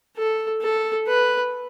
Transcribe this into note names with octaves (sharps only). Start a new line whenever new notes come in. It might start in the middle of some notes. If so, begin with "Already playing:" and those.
A4
A4
B4